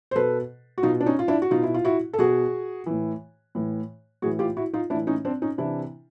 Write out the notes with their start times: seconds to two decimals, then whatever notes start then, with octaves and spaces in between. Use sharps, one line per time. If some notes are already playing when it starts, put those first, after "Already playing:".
0.11 C5
0.16 B2 A4 B4
0.78 F#4
0.83 B2 D#4 F4
1.01 D4
1.06 C#4 D#4
1.19 F4
1.28 D4 E4
1.42 F#4
1.51 B2 D#4 F4
1.63 E4
1.74 F4
1.85 E4 F#4
2.13 A4
2.19 B2 F#4 G#4
2.86 A2 E3
3.55 A2 E3
4.22 A2 E3 F#4 G#4
4.39 F4 G4
4.57 E4 F#4
4.73 D#4 F4
4.90 A2 D4 E4
4.95 E3
5.07 C#4 D#4
5.25 C4 D4
5.42 C#4 D#4
5.58 C3 E3 D4 E4